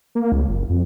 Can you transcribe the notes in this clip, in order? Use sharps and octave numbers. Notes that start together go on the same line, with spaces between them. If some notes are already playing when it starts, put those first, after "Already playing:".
A#3
C#2
F#1
F2